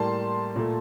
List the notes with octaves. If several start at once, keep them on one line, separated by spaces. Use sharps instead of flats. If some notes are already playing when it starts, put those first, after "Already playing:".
Already playing: A2 G3 A#3 A5 C6
A#2 A3